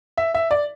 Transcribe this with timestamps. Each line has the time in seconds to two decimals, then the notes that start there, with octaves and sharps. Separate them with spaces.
0.17 E5
0.34 E5
0.51 D5